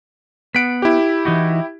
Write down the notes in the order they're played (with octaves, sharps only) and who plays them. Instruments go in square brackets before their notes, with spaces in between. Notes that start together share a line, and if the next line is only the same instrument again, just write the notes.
[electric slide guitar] B3 F#5 [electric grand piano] B6 D7
[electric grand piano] E4 G4
[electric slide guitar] E3 D#4 F#4